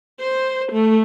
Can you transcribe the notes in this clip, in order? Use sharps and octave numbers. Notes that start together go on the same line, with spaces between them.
C5
A3